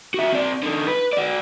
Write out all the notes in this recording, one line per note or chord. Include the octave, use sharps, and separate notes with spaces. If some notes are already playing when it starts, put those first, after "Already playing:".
F#4 E5
C4 D5
D3 D#4
B4
F#4 D5